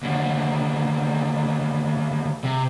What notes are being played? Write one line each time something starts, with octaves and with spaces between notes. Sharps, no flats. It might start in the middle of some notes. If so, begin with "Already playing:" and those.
D#2 D3
C3